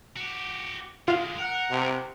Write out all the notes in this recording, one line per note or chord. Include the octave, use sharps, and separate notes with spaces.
F#4 G4
D3 G#3 F4 F5
A#4 F#5
C3